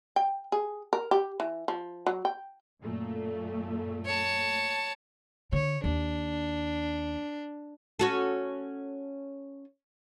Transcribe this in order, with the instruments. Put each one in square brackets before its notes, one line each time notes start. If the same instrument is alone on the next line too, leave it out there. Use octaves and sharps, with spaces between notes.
[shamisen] G5
G#4
A#4
G4
E3
F3
F#3
G5
[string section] F#2 A#2 A3
[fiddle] C#5 A5
[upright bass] D3 [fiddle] C#5
[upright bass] D#2 [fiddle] D4
[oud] C#4 F#4 A4